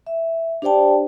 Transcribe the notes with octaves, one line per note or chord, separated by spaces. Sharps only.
E5
D4 G4 C5 D5 G5 A5